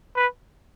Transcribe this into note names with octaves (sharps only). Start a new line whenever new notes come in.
B4